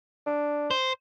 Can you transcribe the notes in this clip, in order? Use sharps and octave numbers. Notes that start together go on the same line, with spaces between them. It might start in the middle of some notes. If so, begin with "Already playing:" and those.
D4
C5